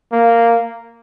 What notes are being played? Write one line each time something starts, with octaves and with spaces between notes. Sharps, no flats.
A#3